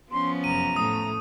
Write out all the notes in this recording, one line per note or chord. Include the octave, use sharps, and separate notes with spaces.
F3 B3 C#4 C6
F1 F#2 A#5 D#7
A2 A3 D#6